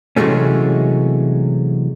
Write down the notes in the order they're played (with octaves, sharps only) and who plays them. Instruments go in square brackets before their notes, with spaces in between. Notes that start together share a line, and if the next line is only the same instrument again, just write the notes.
[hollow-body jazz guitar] C3 E3 F#3 G#3 A3 C#4